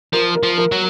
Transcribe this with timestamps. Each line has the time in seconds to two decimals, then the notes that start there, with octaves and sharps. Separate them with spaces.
0.13 F3 A#4
0.35 A#4
0.43 F3
0.58 A#4
0.72 F#3